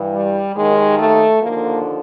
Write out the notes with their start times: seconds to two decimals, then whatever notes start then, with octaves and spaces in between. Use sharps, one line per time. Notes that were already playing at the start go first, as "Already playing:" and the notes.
Already playing: G2 E3
0.13 G3
0.55 D#2 D#3 G#3
0.98 A3
1.40 D#2 D3 F3 A#3